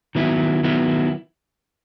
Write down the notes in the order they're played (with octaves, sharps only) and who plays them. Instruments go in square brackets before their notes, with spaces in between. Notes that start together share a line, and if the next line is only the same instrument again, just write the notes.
[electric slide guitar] D#3 F#3 B3 E4
D#3 F#3 B3 E4